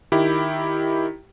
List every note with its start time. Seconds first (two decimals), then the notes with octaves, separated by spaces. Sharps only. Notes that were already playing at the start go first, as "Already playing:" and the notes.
0.12 D#3 E4 G4